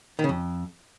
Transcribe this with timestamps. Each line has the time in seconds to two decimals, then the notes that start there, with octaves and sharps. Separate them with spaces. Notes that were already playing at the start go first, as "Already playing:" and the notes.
0.19 D#3
0.24 C#3
0.29 F2